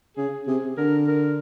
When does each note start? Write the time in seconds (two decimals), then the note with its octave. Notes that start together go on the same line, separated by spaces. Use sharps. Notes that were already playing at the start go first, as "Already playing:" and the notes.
0.17 C#3 G#4
0.47 C3 G#4
0.77 D3 A#4
1.08 A#4